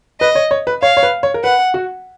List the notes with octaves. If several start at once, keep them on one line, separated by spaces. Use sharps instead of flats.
B4 D#5
C#5
C#5
B4
C#5 F5
C#5
B4
C#5
A#4
B4 F#5
F#4